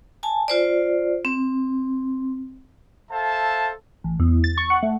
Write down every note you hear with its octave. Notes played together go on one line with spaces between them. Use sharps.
G#5 A5
F4 C5 D5
C4
A4 C5 E5 F5 A5
A1
E2
A6
C#6
F#5
A3